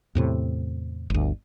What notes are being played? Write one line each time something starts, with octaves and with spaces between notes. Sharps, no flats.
E2 A2 C3
G1 D2